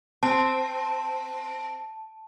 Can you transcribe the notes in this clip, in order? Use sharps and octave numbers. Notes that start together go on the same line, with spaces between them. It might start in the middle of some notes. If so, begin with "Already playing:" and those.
C4 A5